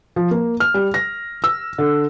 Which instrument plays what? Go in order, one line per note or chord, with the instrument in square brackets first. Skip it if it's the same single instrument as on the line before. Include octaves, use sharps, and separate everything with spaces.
[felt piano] F3
A#3
F6
G3
A#6
E6
D3